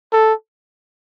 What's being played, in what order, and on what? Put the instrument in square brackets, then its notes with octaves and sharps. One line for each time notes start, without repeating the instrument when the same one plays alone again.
[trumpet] A4